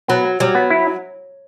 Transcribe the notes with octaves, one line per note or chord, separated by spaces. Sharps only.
F#3 B3
F#3 G3
B3
E4